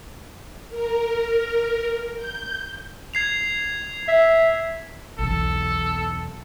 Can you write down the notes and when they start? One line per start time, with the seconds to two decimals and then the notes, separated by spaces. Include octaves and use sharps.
0.69 A#4
2.16 G6
3.14 G#6 C7 F7
4.08 E5
5.19 B1 E2 A4